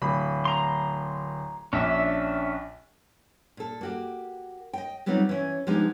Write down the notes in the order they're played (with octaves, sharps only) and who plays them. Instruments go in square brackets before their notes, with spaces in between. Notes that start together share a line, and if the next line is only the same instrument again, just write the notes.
[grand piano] D1 B5
[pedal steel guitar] A#5 C6
[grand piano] A#1 [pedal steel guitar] C#4 D4 E5
[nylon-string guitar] A#2 A4
A#3 F#4 G4
D#5 G5
F#3 G3 B3 C4 D#4 F4
E3 C#4
F3 G#3 B3 D4 D#4 G4